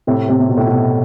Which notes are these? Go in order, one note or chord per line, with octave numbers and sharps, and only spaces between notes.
A2 C3
A2 C3
C3
B2
A2
B2